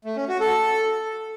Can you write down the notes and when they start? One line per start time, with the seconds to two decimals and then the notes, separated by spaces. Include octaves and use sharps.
0.05 A3
0.17 C#4
0.28 F#4
0.40 A4